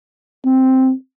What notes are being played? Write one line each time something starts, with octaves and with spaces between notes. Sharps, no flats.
C4